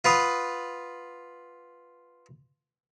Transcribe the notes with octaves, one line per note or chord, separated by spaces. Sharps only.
F4 B4 F5 F#5 D#6